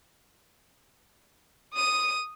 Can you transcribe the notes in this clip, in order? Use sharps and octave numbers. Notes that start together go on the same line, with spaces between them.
D#6 D#7